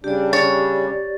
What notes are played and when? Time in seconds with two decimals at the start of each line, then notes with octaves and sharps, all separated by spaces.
0.04 C#3 G3 D4 G4 D5
0.33 C#5 A6